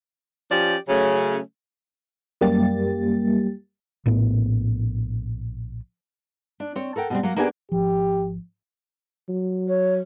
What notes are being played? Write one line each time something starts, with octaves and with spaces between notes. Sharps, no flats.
F3 C#4 G4 D5
C#3 F#3 A3 C#4
F#2 G3 A#3 G4 A6
A#1 A2 B3
D4
C4 C#5
A4 A#4 F#5 G5
B2 G3 C4
F#3 A#3
A#3 B3 D4 G4 G#4 G#5
G#1 F3 G4
F#3
C#5